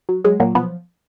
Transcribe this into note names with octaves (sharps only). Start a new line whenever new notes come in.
F#3
F#3 G#3
A#2 F#3 A#3
B2 F3 B3